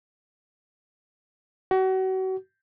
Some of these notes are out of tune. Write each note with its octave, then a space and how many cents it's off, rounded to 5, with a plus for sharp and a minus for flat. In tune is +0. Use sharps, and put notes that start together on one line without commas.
F#4 +35